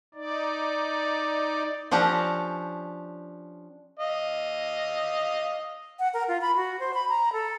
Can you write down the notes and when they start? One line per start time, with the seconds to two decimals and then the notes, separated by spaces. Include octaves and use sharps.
0.15 D#4 D5
1.91 F3 C#4 D4 G4 A#5
3.99 D#5 F5
5.99 F#5
6.14 A#4
6.28 F4
6.42 B5
6.56 F#4
6.80 C5
6.94 B5
7.09 A#5
7.33 A4